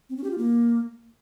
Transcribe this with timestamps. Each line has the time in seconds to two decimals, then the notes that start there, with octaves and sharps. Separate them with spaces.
0.10 C4
0.17 C#4
0.24 G4
0.31 F4
0.38 A#3